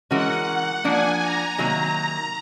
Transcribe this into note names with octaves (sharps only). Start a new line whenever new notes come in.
E3 G#3 C#4 F#4 A#4 F#5
F3 A#3 D4 G#5
A#5
C3 D#3 F#3 A#3